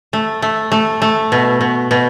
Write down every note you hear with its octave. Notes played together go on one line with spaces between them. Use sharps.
A3
A3
A3
A3
B2
B2
B2